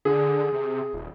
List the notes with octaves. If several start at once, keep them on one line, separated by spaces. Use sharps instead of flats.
D3 G#4
C3
D#1